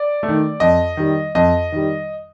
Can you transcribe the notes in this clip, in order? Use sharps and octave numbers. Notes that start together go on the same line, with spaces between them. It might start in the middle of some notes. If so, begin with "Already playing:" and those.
Already playing: D5
A3
D#3
F2 D#5
D#3 G3
F2 D#5
D#3 G3